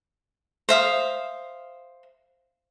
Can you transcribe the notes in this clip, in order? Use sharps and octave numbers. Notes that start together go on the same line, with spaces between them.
C5 E5 F5 D#6